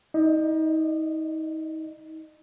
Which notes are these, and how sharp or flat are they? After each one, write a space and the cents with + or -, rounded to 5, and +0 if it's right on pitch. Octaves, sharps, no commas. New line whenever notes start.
D#4 +35 D#5 -40